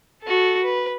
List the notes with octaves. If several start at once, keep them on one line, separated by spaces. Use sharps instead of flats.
F#4 A4
B4